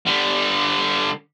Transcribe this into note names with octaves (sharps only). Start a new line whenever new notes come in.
D3 G3